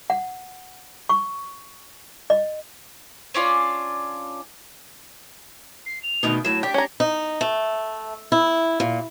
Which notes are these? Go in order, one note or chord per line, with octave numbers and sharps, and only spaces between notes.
F#5
C#6
D#5
C#4 D4 F4 D5
C7
F7
D2 B2 D#3
A2 F#3 E7
D4 G4 G5 B6
C#4 A#5 G#6
D#4
A3
E4
A#2